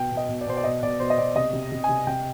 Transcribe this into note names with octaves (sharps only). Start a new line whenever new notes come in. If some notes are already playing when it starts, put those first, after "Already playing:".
Already playing: B2 G5
B2
D#5
B2
D5
B2 C5
D5
B2 D#5
B2 D5
B2 C5
D#5
B2 D5
C3 D#5
C3
C3
C3 G#5
C3 G5